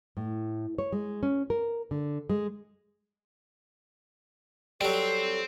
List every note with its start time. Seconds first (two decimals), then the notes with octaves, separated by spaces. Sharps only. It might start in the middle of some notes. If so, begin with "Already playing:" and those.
0.17 A2
0.78 C#5
0.92 G#3
1.23 C#4
1.50 A#4
1.91 D3
2.29 G#3
4.81 F#3 G3 C4 A4